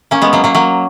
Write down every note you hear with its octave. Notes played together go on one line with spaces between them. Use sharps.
A#3 C#4
G#3 B3
F#3 A#3
F#3 A#3
F#3 A#3